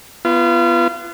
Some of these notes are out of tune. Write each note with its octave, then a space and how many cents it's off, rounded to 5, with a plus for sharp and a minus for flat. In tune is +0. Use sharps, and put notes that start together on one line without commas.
B3 +0 F4 -30